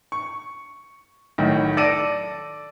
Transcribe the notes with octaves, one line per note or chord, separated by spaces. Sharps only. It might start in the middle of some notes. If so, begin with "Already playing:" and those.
C#6
B1 A2 D#3
A4 D5 A#6 D7 D#7